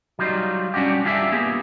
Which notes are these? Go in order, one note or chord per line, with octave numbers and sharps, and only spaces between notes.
F#3 G3 D#4 F4
G3 C#4 D4 F#4 G4
D4 F4 G4 G#4 E5
A#3 B3 G4 G#4